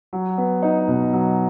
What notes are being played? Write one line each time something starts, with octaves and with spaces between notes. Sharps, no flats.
F#3
B3
D#4
B2
F#3